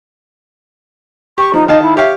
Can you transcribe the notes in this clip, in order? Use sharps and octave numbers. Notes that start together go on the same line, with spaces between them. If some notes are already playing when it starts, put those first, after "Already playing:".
G4 C#6
F3 D#4
D#3 D#5 F5 A5
E4
G4 C#5 E5 F5